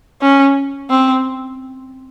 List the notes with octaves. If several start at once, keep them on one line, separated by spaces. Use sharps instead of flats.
C#4
C4